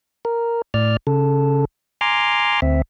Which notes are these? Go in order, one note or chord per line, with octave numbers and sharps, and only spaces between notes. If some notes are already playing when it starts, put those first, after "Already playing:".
A#4
A2 D5 F6
C#3 A4
G#5 A#5 C6 D6 F6
D2 C4 E5